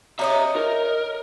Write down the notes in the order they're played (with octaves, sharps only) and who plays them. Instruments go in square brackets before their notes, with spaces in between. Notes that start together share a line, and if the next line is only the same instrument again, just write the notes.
[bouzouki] D#4 C#5 D#5 [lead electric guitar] E5 A#5
[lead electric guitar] A#4